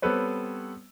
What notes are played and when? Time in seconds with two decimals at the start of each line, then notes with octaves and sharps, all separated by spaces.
0.02 G3 B3 C4 A4 B4 C#5